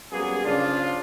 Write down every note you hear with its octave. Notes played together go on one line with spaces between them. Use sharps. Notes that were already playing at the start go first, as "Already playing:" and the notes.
F#2 G3 A#3 B3 G#4
C#3 F3 D4 F4